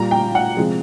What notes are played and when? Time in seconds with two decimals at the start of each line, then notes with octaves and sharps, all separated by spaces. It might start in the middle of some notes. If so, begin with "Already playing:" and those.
Already playing: A#2 G3 A#3 A#5
0.11 G5
0.35 F#5
0.57 C3 F3 G#3